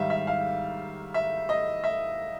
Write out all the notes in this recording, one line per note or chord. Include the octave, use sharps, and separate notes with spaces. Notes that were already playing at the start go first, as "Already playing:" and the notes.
Already playing: G#2 D#3 G3 E5 F5
E5
F5
E5
D#5
E5